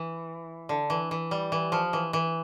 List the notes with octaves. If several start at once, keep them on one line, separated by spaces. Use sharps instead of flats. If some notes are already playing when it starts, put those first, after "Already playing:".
Already playing: E3
D3
E3
E3
G3
E3
F3
E3
E3